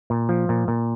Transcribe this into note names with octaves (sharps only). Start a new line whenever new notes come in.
A#2
F3
A#2
A#2